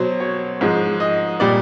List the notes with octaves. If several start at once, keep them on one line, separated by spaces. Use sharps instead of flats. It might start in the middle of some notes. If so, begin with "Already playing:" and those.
Already playing: B2 F#3 C5
C#5
G#2 F3 G#3
D#5
A#2 G3 D5